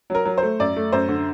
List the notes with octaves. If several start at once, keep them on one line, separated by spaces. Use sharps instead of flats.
F#3 A#4
F#3
A3 C5
F#2 D5
A3
F#2 C5
D3